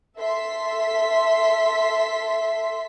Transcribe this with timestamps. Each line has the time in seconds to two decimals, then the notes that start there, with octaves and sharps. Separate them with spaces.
0.19 A4 E5 C6 B6